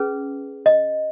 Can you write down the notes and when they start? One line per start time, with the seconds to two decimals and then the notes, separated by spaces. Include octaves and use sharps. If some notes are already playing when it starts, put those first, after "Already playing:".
Already playing: C#4 G#4 B4
0.66 D#5